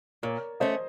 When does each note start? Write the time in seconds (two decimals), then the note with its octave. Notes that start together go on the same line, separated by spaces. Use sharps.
0.23 A#2 A#4 C#5
0.60 A3 C#4 C5 D#5